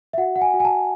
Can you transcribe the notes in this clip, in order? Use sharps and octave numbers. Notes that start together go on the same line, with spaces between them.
E5
F#4 F#5
F#5
G#5
F#4
G#5
A5